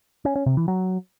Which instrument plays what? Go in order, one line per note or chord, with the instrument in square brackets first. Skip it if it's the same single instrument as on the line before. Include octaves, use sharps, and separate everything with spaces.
[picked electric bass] C#4
C#4
C3
E3
F#3